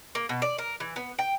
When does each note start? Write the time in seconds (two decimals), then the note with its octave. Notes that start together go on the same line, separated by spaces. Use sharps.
0.15 A#3
0.29 B2
0.42 D5
0.58 A#4
0.80 E3
0.96 B3
1.19 G5